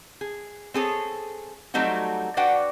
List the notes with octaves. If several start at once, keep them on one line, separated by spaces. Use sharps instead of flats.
G#4
C4 G#4 A4 C#5
F#3 G3 A3 C4 D#4 F#4
D4 F#4 B4 D5 F#5 G5